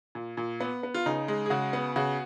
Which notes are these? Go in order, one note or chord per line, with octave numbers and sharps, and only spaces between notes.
A#2
A#2
B3
B3
F4
C#3 D#4
G#3
G#4
C#3 F#4
B3
C#3 F#4